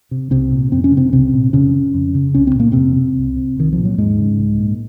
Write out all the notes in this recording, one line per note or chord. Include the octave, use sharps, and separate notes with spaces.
C3
C2 C3 C4
A#2
F2 C4
C#4
C#3
C3 C4
C2 C3 C4
A#2
F2 C#3 C#4
C#3
F2
C#3
C2 C#4
C4
A#2 A#3
F2 C3 C4
C3
C2
C3
C2 D#3
F3
A#2
F#3
D#2 G#2 G#3
C#3
C2
A#2